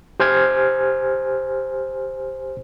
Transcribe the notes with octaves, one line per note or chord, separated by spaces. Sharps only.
G4 C5 G#5 F6 G#6